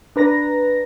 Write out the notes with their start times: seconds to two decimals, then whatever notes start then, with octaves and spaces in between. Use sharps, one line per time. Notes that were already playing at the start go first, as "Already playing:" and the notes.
0.16 D4 B4 A#5 A#6